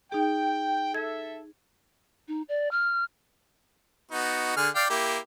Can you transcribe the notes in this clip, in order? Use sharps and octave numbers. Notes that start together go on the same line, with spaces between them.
D#4 G#4 G5
A4 E5 G#6
D#4
D5
F6
B3 D#4 F#4
D3 G#4 F6
D5 F5 G5
A#3 E4 G4